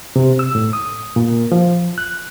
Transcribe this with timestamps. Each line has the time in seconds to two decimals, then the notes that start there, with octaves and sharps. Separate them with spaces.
0.16 C3
0.39 E6
0.55 A2
0.73 D#6
1.16 A#2
1.52 F3
1.98 F#6